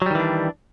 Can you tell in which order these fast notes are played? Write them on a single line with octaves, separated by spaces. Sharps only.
F#3 G3 D#3 E3 D4